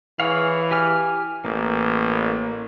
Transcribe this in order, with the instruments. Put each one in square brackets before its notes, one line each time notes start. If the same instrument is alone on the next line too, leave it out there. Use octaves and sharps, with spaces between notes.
[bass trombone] E3 [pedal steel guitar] G#4 C#5 F5
[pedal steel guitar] G4 G#5 F6
[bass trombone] A1 [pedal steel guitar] A#3